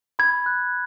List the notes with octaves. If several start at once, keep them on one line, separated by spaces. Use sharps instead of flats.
B5 G#6
F#6